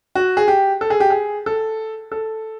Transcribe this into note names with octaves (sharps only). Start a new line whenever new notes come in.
F#4
G#4
G4
A4
G#4
G4
G#4
A4
A4